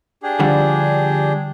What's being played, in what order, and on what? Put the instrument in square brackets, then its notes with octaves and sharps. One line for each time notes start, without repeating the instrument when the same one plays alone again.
[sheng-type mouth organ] D4 G4 G#4
[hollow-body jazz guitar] D3 F3 G3